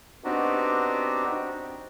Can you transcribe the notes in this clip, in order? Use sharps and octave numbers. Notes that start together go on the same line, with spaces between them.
B3 C4 D4 D#4 F#4 G4